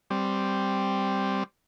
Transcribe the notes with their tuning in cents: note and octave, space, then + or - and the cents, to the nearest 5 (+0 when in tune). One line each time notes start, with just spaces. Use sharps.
G3 +0 C4 +0